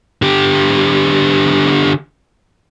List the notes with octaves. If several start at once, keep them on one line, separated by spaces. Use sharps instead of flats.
D3 G4